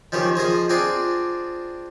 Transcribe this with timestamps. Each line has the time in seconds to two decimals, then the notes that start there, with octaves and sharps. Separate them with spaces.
0.12 D#3 F3 C#4 G4
0.36 F3 G#4 D#5 G#5
0.70 C4 D4 F4 G#4 D5